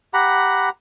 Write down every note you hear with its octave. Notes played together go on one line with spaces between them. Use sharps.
G4 F#5 A#5 B5